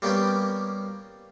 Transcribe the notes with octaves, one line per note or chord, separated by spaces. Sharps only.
G3 A#3 B3 C#4 G4